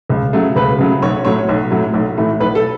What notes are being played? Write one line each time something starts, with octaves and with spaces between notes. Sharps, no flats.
C#2
C#3 F#3 A3
C#2 B4
C#3 F#3 A3
B1 C#5
A2 F#3 A3 C#5
B1
A2 F#3 A3
B1
A2 E3 A3
B1 B4
A4